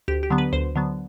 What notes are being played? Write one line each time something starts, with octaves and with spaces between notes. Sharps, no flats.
D2 G4
G4
D3 F#3 B3
B4
D2 C5
D3 F#3 B3